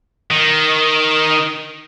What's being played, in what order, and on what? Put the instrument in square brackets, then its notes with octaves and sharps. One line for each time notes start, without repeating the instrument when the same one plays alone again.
[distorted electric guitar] D#3